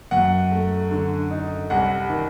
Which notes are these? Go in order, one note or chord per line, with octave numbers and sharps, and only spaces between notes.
F#2 F#5
A3
D3
D#4
C2 F#5
D#3